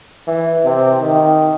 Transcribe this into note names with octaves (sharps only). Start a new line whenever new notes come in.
E3
C3
D#3